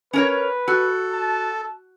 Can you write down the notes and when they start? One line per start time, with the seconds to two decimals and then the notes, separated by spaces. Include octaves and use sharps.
0.13 C#4 A#4 B4 C#5
0.68 F#4 A4
1.12 A5